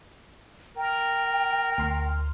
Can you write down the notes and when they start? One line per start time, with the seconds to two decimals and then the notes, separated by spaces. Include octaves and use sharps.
0.77 A#4 G5
1.78 D2 C6 F6